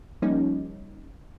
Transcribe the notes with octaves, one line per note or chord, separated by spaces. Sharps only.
F3 G3 A#3 C#4 D#4